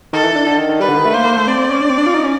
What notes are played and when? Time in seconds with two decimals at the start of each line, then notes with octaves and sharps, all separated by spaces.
0.13 D#3 A4
0.24 E3
0.35 D3
0.46 D3
0.58 D#3
0.69 D#3
0.80 G3 B4
0.88 D3
0.97 D#3
1.05 A3
1.14 A#3 C5
1.25 A#3
1.36 A3
1.47 C4 D5
1.59 C4
1.70 C#4
1.81 D4
1.90 C4
1.98 D4
2.06 F4
2.14 D#4
2.24 C#4